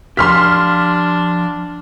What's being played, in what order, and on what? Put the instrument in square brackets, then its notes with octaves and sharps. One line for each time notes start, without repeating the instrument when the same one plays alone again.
[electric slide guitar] F3 G4 [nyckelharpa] D4 [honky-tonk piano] C6 F6 B6